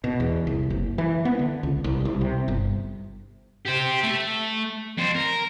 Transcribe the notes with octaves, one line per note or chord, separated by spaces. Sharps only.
B2
E2
C2
F#1
E3
B3
D3
C#2
C2
C2
C3
G1
G4 C5
A3
F2 C5
A#4